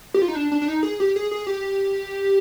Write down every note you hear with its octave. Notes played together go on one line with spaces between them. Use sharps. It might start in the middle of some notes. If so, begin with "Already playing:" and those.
G4
F4
D#4
D4
D4
D4
D#4
G#4
G4
G#4
G#4
G4